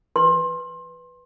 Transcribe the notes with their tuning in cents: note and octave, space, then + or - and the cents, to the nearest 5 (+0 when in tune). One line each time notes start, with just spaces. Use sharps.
B4 +0 C6 +25